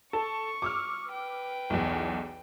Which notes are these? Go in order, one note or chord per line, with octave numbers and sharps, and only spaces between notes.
A4 C#6
D6 E6 F6
B4 G5
B1 E2